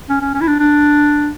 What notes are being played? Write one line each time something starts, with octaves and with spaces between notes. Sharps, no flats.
C#4
C#4
C#4
E4
D4
D4